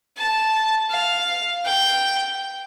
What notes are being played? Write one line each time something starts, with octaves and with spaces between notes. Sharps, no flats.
A5
F5
G5